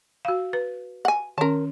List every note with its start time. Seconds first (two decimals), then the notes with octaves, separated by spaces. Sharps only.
0.25 F#4 F5
0.53 B4
1.05 F#5 G#5
1.38 D#3 C#4 A#4 A5